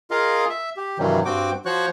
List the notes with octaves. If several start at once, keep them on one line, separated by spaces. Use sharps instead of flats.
F4 G#4 A#4 D#5 F5
E5
G4
G2 C3 D#3 E3 F#3 G3
G2 C4 F#4 G5 D6
F3 F#4 C5 C#5 C#6 F#6